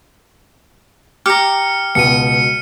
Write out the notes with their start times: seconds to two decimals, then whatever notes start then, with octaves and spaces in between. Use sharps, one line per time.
1.26 G4 A#5 F6 C#7
1.95 C#2 B2 C#7 D#7